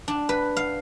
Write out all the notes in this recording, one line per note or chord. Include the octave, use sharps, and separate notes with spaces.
D4
B4
F5